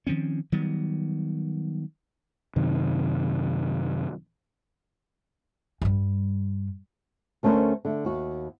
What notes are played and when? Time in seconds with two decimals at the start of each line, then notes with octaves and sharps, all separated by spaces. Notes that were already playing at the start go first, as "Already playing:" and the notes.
0.07 D#3 F3 C4 C#4
0.52 D#3 F#3 G3 B3
2.56 F#2 C3 D#3
5.82 G2 G3
7.43 D2 A3 C#4 D4 A#4 C5
7.85 D3 A3
8.05 D#2 F#4